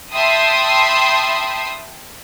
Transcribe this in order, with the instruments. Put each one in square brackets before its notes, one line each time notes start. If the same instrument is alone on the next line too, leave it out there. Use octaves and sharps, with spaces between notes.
[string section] E5 G5 A5 B5 C6 D#6